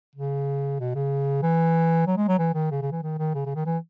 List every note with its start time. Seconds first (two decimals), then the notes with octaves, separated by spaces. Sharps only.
0.15 C#3
0.80 B2
0.95 C#3
1.42 E3
2.07 F#3
2.17 G#3
2.28 F#3
2.39 E3
2.54 D#3
2.71 C#3
2.82 C#3
2.92 E3
3.03 D#3
3.18 D#3
3.34 C#3
3.45 C#3
3.55 D#3
3.66 E3